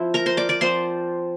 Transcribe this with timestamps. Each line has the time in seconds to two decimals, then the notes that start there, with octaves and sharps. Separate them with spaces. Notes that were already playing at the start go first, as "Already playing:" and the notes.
Already playing: F3 C4 E4 C5
0.14 A#4 A#5
0.26 C5 C6
0.37 D5 D6
0.49 D5 D6
0.61 F3 C4 F4 C5 C6